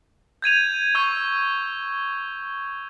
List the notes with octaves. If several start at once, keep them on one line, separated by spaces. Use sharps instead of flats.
G6 G#6 D#7 F7
C#6 E6 G#6 D#7